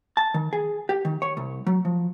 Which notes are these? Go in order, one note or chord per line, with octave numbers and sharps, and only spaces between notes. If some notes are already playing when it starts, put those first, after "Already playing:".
A5
D#3
G#4
G4
D#3
C#5
C2
F#3
F3